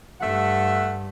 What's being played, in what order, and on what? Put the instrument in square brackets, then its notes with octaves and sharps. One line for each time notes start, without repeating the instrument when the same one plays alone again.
[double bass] G2 [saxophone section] A3 E5 F#5